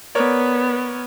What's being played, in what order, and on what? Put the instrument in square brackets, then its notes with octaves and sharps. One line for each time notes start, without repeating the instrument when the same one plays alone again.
[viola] B3 [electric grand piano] A#4 C#5 D5